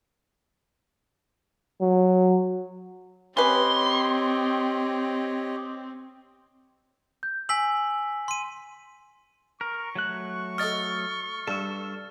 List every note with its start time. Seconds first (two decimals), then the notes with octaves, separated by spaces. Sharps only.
1.81 F#3
3.37 C4 C#4 G4 B4 C#5 D#5 C6
7.23 G6
7.49 G#5 E6 B6 F#7
8.28 C6 D#7
9.61 A#4 C#6
9.96 F#3 A3 F#6
10.58 A4 D#5 D#6 F6 A6
11.48 G2 A4 E6